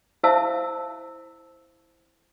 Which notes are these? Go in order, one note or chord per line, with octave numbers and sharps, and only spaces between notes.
E4 C5 E5 F5 A5 E6